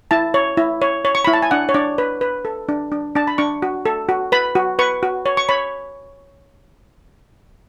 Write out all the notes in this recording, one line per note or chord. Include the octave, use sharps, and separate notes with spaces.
E4 A5
C#5
E4
C#5
C#5
C#6
E4 B5
A5
G#5
D4 F#5
C#5
D4 D5
B4
B4
A4
D4
D4
D4 A5
B5
D4 C#6
F#4
A4
F#4
B4 B5
F#4
B4 C#6
F#4
C#5
C#6
C#5 B5